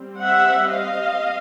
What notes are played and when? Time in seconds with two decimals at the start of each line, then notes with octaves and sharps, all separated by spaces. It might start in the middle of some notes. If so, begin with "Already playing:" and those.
Already playing: G3 C4
0.23 E5 F#5
0.70 D#5 F5